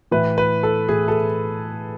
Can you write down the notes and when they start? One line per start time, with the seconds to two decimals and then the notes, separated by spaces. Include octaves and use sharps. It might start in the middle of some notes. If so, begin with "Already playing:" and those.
0.11 A2 E3 B4
0.38 B4
0.63 A4
0.88 A2 E3 G#4
1.08 A4